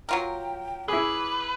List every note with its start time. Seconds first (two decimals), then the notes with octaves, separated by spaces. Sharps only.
0.09 F#3 F4 A#4 G5
0.88 E4 G#4 B4 D6